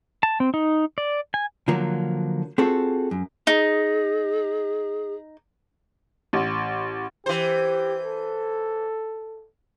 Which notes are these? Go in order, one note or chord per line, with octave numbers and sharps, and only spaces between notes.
A5
C4
D#4
D5
G#5
D3 F3 F#3 A#3
C4 F4 F#4 G#4 A4
F#2
D#4 G#4
A1
E3 G4 C5
A4